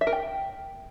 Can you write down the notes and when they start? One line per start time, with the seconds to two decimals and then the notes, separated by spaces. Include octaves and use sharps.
0.01 E5
0.07 A#4
0.13 G5